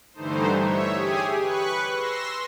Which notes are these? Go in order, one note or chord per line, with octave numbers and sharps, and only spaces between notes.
G2 D3 E3 A3 D#4 C5
C#5 E5
G4 G#4 G#5 D#6
B4 C#6 F#6
C6 E6 A#6